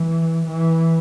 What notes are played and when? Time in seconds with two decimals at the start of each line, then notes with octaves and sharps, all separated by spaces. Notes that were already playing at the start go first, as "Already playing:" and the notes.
Already playing: E3
0.47 E3